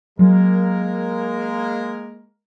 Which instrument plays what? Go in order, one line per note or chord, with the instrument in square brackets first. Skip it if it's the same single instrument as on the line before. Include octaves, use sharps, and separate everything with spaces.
[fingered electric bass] F#3 [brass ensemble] G#3 A#3 A#4